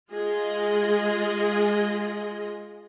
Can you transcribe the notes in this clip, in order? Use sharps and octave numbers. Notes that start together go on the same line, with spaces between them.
G#3 F4 G#4 D#5